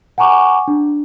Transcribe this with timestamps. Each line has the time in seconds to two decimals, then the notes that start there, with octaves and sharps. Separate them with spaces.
0.18 F#5 G#5 A#5 C#6 D6
0.68 D4